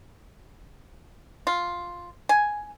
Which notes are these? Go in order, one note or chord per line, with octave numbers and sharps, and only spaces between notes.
F4
G#5